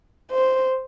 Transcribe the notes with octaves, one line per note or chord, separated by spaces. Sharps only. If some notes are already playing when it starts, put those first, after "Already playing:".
C5